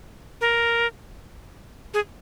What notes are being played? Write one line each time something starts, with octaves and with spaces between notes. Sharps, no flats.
A#4
G#4